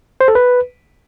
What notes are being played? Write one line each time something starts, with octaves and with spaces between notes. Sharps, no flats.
C5
A4
B4